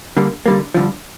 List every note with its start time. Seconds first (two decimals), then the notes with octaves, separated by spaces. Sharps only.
0.17 D3 G3 A#3
0.46 D3 G3 A#3
0.74 G2 D3 F3